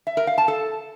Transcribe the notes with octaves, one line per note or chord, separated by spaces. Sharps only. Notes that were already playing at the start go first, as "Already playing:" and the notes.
E5
A#4
F5
A5
A4